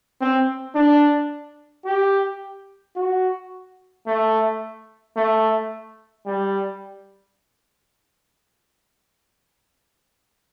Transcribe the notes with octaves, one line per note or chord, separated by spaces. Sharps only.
C4
D4
G4
F#4
A3
A3
G3